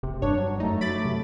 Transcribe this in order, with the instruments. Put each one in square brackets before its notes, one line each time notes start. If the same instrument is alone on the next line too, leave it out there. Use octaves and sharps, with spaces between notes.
[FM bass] F1 [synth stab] C3
[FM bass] G2 [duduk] D4 [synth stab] C#5
[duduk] F#3
[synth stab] F#2 D#4 [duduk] A3
[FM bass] F#3 [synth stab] B5 D6 A6
[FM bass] C3